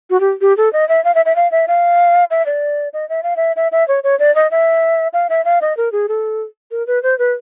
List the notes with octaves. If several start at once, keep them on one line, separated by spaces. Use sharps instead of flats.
F#4
G4
G4
A4
D#5
E5
F5
E5
E5
F5
E5
F5
E5
D5
D#5
E5
F5
E5
E5
E5
C#5
C#5
D5
D#5
E5
F5
E5
F5
D#5
A#4
G#4
A4
A#4
B4
C5
B4